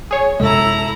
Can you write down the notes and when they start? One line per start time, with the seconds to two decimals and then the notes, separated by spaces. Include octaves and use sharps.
0.11 G#4 C#5
0.40 F#2 C3 G#3 E4 A4 A#5